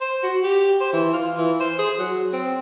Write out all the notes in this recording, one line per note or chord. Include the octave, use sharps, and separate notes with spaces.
C5
F#4
G4
C5
E3
F4
E3
C5
G#4
F#3
C4